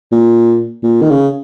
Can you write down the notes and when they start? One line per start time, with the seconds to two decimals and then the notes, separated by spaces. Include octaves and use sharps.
0.12 A#2
0.83 A#2
1.02 D#3
1.10 C#3